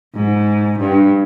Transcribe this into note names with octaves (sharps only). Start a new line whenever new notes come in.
G#2
G2